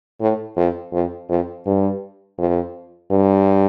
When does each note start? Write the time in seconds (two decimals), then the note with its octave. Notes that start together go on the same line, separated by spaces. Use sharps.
0.21 A2
0.57 F2
0.93 F2
1.29 F2
1.66 G2
2.38 F2
3.12 G2